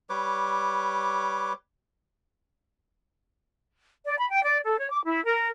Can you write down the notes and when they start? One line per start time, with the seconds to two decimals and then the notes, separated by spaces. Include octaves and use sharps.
0.10 G3 B4 C#5 D6
4.06 D5
4.18 B5
4.31 G5
4.43 D5
4.65 A4
4.79 C#5
4.92 D6
5.04 E4
5.25 A#4